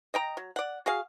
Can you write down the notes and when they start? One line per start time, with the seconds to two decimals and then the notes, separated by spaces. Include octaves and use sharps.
0.14 D#5 G5 A#5
0.37 F#3
0.56 D5 F#5
0.86 F#4 G#4 F5